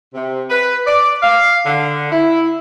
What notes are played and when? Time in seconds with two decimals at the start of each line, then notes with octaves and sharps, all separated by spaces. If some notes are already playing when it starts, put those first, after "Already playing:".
0.14 C3
0.50 B4
0.87 D5
1.23 F5
1.65 D3
2.11 E4